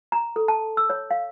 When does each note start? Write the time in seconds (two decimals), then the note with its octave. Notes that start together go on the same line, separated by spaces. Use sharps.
0.12 A#5
0.36 A4
0.48 A5
0.77 E6
0.90 C#5
1.11 F5